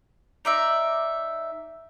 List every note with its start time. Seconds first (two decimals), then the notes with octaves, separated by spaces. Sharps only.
0.45 D#4 D5 E5